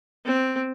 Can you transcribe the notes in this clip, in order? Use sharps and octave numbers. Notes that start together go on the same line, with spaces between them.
C4